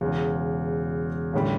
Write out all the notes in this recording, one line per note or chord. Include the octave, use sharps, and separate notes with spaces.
E1 E2 C#3
A1 D3 G3